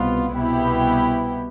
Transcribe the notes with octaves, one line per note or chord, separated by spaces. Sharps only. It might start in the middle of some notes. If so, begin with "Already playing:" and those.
Already playing: C2 B2 B3 F4
C2 B2 B3 E4 G4